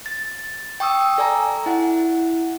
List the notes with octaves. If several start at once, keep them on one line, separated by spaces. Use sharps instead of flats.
A6
G5 C#6 D#6 E6
A4 D5 G#5 A#5
E4 F#5